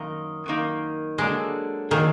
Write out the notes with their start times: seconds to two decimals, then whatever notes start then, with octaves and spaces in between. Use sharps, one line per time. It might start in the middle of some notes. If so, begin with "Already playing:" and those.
Already playing: F#2 D#3 A#3 D#4
0.46 F#2 D#3 A#3 D#4
1.18 D3 F#3 G#3 A#3 D4 G#4
1.91 D3 D#3 F#3 A#3 D4 G#4